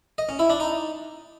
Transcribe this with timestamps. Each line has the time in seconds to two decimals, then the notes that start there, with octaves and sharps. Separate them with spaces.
0.18 D#5
0.29 C#4
0.39 E4
0.50 D4
0.60 D#4